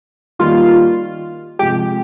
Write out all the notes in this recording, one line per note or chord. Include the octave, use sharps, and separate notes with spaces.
D#3 G3 A#3 D#4 F4
C3 F3 G#3 G4